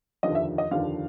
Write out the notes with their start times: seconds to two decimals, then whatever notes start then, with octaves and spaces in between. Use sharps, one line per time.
0.23 F1 D#2 D3 F3 D#5
0.35 E5
0.58 D#5
0.71 F1 D#2 D3 F3 F5